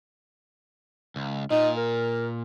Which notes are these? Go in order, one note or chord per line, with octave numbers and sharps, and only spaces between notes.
C#2
A#2 D#4
A#4